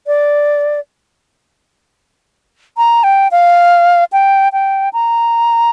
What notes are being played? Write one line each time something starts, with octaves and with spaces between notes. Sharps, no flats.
D5
A#5
G5
F5
G5
G5
A#5